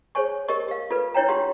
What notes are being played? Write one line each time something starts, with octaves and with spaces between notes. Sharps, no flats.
G#4 C5 C#5 G#5 C#6
G4 A#4 D#5 C#6
G4 F5
F4 A4 B4
D4 E4 C#5 G5 A#5
F4 G4 F#5 C6